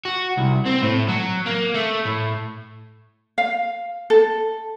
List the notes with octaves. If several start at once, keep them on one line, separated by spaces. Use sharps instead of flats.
F#4
C2
C4
A2
F#3
A#3
A3
A2
F5
A4